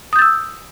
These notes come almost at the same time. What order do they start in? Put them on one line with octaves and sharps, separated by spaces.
D#6 G6 A6 E6